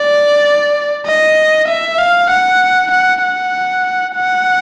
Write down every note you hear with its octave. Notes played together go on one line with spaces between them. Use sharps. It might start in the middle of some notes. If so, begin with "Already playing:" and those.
Already playing: D5
D#5
E5
F5
F#5
F#5
F#5
F#5